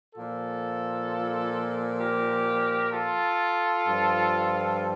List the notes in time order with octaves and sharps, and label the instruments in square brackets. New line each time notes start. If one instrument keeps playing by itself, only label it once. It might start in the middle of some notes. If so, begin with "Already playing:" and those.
[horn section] A#2 F3 F4 A4
G4 A#4
F4 A4
G2 F3